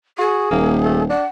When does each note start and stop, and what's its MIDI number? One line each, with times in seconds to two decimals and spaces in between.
0.18 0.46 66
0.18 1.04 68
0.51 1.11 27
0.51 0.77 58
0.85 1.02 57
1.10 1.24 62
1.10 1.29 78